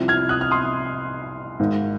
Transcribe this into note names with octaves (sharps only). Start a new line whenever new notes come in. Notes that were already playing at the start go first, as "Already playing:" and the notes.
Already playing: C2 C3 F3 C4
F6 G#6
D#6 F#6
F6
C6 D#6
G#1 G#2 D#3